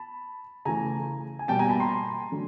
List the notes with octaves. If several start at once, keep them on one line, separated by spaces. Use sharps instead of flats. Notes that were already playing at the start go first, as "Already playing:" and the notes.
Already playing: A5 B5
C#3 E3 A3 G#5 A#5
G#5
B2 G3 A#3 G5 A5
G#5 A#5
A5 B5
A#5 C6
D3 F#3 A3